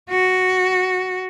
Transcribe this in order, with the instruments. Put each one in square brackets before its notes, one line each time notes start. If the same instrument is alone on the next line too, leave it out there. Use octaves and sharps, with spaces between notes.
[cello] F#4